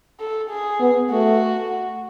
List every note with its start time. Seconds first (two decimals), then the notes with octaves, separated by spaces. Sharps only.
0.20 A4
0.50 G#4
0.80 B3
1.11 A3 F#4